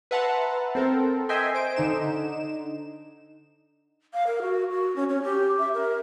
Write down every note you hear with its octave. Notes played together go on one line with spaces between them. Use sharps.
B4 E5 F#5 A5 A#5 C6
C4 A4 A#4
D#5 E5 G5 G#5 C6
C5 D7
D3 D#4 E7
F5
A#4
F#4
F#4
C#4
C#4
G4
E5
A#4